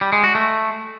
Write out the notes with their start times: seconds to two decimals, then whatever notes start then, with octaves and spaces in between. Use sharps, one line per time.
0.01 G3
0.13 G#3
0.24 F#4
0.35 A3